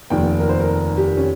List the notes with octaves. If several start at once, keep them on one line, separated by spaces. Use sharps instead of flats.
F1 D#2 D#3 G5
A#4
C5
A#4
G4
C#4